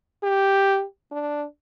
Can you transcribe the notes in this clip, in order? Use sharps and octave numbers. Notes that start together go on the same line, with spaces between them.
G4
D4